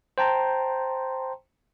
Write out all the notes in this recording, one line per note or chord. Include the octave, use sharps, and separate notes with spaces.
C5 G5 A5 A#5 C6